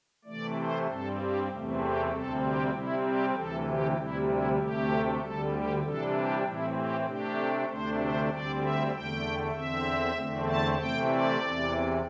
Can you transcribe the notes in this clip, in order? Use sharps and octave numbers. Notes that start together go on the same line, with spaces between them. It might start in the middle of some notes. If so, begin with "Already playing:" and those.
C3 E3 A3 D5
C5
G2 G3 C4 A4
G4
E2 C3 E3 A3 C4
G4
D2 C3 G3 C4 A4
G4
C3 G3 C4 E4
G4
D2 C3 E3 A4
G4
D2 C3 G3 E4
E4
D2 C3 A3 G4
D2 D3 G3 A4
G4
C3 E3 G3 D4 A4
G4
A2 E3 C4 E4
G4
C3 A3 D4 G4
D2 C3 A3 D4 C5
C5
D2 D3 G3 C4 D5
E5
E2 D3 A3 G5
E2 D3 C4 E5
E2 D3 A3 C4
A5
C3 E3 A3 C4 G5
D5
E2 C3 E3